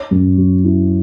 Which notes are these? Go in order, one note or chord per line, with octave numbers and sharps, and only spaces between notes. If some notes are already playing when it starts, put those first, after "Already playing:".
Already playing: C#5
F#2
F#3
E4